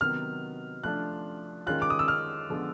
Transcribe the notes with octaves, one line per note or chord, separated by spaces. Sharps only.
C3 D#3 F#3 B3 F6
F3 A3 D4 F4 F#6
D#3 G#3 C#4 F4 F#6
D6
D#6
E6
F6
D3 F3 G#3 B3